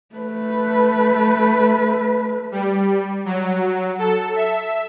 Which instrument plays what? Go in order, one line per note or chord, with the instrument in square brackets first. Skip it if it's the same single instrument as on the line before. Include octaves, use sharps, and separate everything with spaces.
[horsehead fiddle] A3 B4
[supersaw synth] G3
F#3
A4
E5